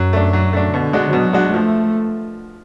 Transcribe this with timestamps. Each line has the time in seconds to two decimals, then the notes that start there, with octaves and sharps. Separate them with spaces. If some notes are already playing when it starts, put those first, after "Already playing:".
Already playing: F#2 F#3
0.13 A3 D4
0.33 F#3
0.53 A3 D4
0.73 B2 D3
0.93 G#3 D4 F#4
1.13 B2 F#3
1.33 G#3 D4 F#4
1.54 F3 A3